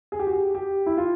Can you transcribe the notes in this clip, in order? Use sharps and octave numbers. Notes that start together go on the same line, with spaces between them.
G#4
G4
F#4
G4
G4
E4
F4